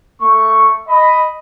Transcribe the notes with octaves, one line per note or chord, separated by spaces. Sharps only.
A3 C#6
D#5 B5